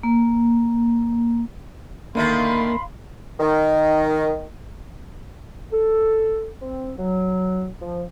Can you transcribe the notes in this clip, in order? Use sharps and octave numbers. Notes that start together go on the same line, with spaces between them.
A#3
D3 D#3 A3 A#3 F5 B5 C6
D#3
A4
C4
F#3
F3